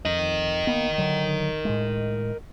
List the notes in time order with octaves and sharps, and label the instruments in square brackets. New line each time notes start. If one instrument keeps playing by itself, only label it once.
[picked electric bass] F2 [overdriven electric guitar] A#4 D#5
[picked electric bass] A#3 B3
D3 F#3
A2 G#3